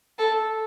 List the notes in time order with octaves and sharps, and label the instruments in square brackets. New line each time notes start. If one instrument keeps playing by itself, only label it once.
[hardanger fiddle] A4